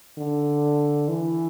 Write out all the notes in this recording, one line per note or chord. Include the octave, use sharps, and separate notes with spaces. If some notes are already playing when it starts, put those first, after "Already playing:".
D3
E3